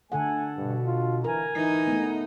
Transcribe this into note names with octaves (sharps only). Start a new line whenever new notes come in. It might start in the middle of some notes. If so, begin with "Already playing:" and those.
D3 A3 A4 F#5 G#5
G2 B2
F4
E3 A#4 G#5 A#5
E3 D#4
A3 B3